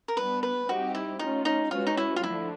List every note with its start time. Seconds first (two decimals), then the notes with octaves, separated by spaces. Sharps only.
0.08 A#4
0.17 G3 B3 D4 B4
0.43 B4
0.68 G3 C4 D#4 F#4 G4
0.95 E4
1.19 A3 C#4 D#4 F4
1.45 D#4
1.71 G#3 C#4 F4 F#4 B4
1.87 D#4
1.97 E4
2.16 F4
2.23 D3 F3 A3 D4 E4